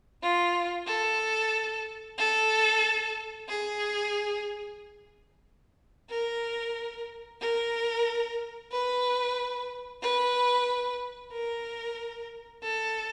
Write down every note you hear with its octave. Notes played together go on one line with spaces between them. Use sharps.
F4
A4
A4
G#4
A#4
A#4
B4
B4
A#4
A4